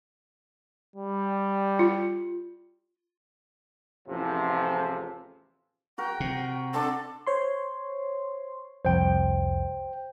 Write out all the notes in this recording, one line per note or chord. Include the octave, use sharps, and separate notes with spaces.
G3
F4
A1 E2 C3 F3
F#4 A#4 G5
C3
C4 D4 A4
C5 C#5 C6
C2 F2 C5 G5